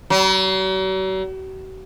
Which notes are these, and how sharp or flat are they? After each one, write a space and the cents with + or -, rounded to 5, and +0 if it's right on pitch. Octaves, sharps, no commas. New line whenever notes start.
F#3 +45